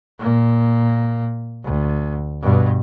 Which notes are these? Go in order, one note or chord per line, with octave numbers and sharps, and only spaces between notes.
A#2 A#3
D2
G2 B2